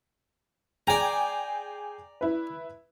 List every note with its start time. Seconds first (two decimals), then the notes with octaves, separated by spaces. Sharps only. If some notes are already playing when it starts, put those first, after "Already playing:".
0.87 G#4 D5 G5 G#5 A#5
2.21 E4 B4